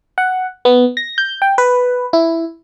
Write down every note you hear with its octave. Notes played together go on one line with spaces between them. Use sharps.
F#5
B3
A#6
G6
G5
B4
E4